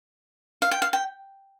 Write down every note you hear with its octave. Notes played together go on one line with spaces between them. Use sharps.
F5
G5
F5
G5